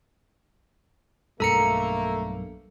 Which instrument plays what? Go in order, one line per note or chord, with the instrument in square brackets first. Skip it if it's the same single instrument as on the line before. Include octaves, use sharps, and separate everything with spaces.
[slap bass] B1 G2 G3 [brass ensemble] A3 A#3 [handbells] A4 A#5 C#7